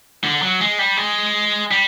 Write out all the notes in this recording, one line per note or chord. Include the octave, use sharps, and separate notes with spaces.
D3
F#3
G#3
G3
G#3
G3